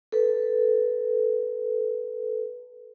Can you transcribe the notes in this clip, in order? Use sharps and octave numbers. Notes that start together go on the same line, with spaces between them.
A4 B4